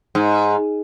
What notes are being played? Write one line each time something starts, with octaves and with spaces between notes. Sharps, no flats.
G#2